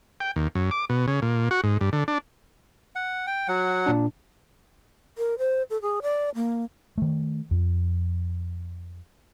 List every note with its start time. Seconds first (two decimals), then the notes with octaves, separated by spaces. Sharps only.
0.20 G5
0.36 D#2
0.55 F#2
0.71 D6
0.90 B2
1.08 C#3
1.22 A#2
1.51 F#4
1.64 G#2
1.81 G2
1.93 D3
2.08 D4
2.96 F#5
3.27 G5
3.48 F#3 F#5
3.86 A#2 D4
5.18 A#4
5.38 C5
5.70 A4
5.82 G#4
6.02 D5
6.35 A#3
6.98 D#3 A3
7.51 F2